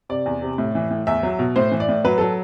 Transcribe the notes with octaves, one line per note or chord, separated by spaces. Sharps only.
C3 D5
E2
C3
A2
E3
A2
E2 E5
F#3
B2
A2 C5
E3
D5
A2
F#3 B4
F#3 A4